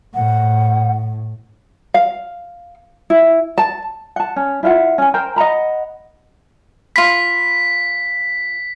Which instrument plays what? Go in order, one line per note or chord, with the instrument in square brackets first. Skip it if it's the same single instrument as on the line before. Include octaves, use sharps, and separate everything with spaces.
[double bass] A2 [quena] F#5
[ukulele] F5
E4
A5
F#5 A5
C#4
E4 F4 E5 F#5
C#4 G#5
A#4 C5 G5 A#5
D#5 F#5 A#5 B5
[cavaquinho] F4 B5 [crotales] B6